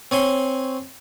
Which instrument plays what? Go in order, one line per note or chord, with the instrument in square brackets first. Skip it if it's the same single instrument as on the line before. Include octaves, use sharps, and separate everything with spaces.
[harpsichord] C4 C#5 G#5 C6